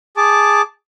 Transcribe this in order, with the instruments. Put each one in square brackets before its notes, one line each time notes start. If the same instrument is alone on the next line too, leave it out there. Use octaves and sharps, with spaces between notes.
[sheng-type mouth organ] G#4 A5 D6